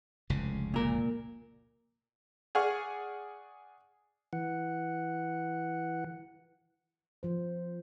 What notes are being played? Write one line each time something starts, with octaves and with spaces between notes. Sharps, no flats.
F1 C#2 C#3
A#2 A#4
G#4 D5 F#5 C#6 F6
E3 F#5
F3 C5